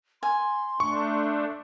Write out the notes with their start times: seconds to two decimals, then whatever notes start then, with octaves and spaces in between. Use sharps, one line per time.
0.23 G#5 C6
0.80 A3 D4 C#6